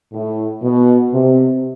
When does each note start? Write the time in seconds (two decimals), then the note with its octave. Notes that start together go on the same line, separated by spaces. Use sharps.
0.13 A2
0.63 B2
1.13 C3